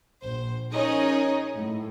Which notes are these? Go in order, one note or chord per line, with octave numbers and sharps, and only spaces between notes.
A#1 C5
C#4 D#4 G#4 A#4 C#5 D#5
A2